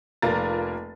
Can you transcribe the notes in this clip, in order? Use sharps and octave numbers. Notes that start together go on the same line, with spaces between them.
F1 A#3 F4 A#5 A6